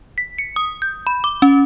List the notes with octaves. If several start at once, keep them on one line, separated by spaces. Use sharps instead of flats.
B6
C#7
D#6
G6
B5
D6
C#4